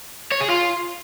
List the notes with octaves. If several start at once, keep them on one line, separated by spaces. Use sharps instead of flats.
C#5
G#4
F4